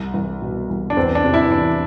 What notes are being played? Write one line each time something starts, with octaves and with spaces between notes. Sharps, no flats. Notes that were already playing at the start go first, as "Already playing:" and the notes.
Already playing: C2
C2
B2
C2
D4
E2 C4
D4
C3
E4
E2 D4